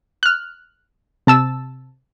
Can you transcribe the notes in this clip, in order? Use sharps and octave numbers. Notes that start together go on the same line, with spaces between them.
F6 F#6
C3 A5 E6